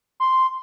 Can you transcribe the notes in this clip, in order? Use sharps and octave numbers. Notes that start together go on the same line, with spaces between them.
C6